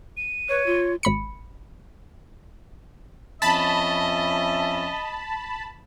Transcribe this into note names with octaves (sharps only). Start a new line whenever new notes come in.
D#7
B4 C#5
F4
G#1 B5 C#7
F2 C#4 D#5 E5 A5 B5